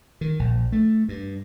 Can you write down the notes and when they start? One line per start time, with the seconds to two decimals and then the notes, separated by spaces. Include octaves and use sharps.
0.21 D#3
0.39 A#1
0.72 A3
1.09 G2